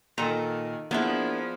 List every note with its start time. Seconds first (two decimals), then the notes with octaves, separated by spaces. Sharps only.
0.18 A#2 D#3 A4 A#5
0.91 F3 A#3 B3 D4 E4 G#4